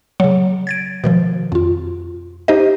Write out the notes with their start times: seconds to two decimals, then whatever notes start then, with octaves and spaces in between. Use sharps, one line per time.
0.20 C#3 F#3
0.67 G#6 A6 D7
1.04 B2 D#3 F3
1.52 F2 F4
2.48 D#4 G4 C5 D#5